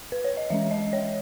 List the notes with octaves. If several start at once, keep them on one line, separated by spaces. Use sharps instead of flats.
B4
C#5
D#5
E3 G#3 C#4 E5
D#5
C#5